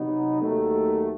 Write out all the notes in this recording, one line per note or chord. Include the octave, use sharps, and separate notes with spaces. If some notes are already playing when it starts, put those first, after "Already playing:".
Already playing: C3 F#3 B3 D#4
D#2 D#3 F#3 A3